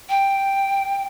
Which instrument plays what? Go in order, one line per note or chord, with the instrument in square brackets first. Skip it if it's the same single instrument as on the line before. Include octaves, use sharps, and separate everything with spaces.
[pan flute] G5